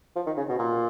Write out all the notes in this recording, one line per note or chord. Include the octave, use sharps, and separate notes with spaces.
F3
D#3
C#3
B2
A#2